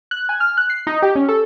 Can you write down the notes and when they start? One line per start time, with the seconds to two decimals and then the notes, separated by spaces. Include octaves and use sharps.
0.11 F#6
0.29 G#5
0.40 F6
0.57 F#6
0.70 C7
0.87 D#4
1.02 G4
1.15 C#4
1.28 A4